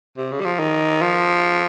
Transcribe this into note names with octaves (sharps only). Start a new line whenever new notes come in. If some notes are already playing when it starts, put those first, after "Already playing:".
C3
C#3
G3
F3
D#3
F3